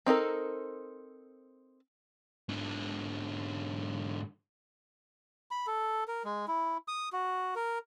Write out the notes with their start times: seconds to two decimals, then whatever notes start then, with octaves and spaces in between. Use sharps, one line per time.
0.06 C4 D#4 A4 A#4
2.49 G#2 D3
5.51 B5
5.67 A4
6.08 A#4
6.24 G#3
6.48 E4
6.88 D#6
7.12 F#4
7.55 A#4